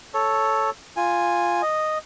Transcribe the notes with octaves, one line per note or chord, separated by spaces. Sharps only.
A4 C#5
F4 G#5
D#5